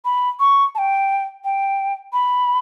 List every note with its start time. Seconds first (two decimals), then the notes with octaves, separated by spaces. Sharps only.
0.05 B5
0.40 C#6
0.75 A5
0.78 G5
1.44 G5
2.13 B5